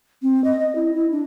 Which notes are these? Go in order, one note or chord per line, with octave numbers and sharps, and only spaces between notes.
C4
D#5
D#5
E4
E4
D4